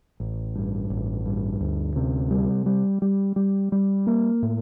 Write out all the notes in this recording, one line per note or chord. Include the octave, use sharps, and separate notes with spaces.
A1
G2
A1
G2
D2
C3
G3
G3
G3
G3
G3
A#3
A2